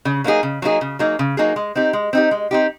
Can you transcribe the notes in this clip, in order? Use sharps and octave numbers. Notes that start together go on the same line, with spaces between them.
C#3
F#3 A#3 D#4 G#4
C#3
F#3 A#3 D#4 G#4
C#3
F#3 A#3 D#4 G#4
C#3
F#3 A#3 D#4 G#4
G#3
C4 D#4 G4
G#3
C4 D#4 G4
G#3
C4 D#4 G4